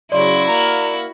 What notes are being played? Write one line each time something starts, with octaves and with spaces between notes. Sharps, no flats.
C#3 F#3 E4 F#4 D5 C6
A#3 A#4 A#5